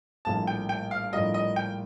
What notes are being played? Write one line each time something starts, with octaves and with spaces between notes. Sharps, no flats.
A#1 A2 G3 A#3 F4 A5
G5
G5
F5
A#1 A2 G3 A#3 F4 D#5
D#5
G5